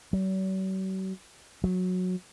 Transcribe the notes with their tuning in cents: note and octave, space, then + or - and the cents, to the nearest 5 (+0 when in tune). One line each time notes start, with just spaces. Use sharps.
F#3 +45
F#3 -15